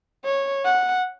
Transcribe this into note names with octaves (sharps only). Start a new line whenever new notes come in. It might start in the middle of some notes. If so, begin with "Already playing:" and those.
C#5
F#5